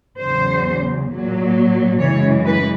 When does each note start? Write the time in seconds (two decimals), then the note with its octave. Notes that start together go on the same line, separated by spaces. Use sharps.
0.19 E2 C#3 F#3 C5
1.09 A#2 F#3
2.00 F#2 C#3 E3 G#3 C#5
2.45 B4